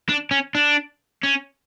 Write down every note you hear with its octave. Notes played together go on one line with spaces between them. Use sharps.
D4
C#4
D4
C#4